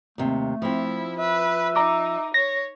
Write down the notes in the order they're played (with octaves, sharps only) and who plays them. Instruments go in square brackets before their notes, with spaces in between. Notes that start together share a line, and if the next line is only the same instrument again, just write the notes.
[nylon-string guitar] D#2 C3 [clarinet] A3
[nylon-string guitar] F3 C4 [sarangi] E4
[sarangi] B4 [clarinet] E5
[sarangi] D#4 [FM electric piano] A#5 D6
[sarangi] C#5 [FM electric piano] A#6